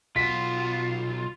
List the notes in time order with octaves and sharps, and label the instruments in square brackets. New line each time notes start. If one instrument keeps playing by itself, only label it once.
[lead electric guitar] B1 F#4 [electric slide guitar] F4 [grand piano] B6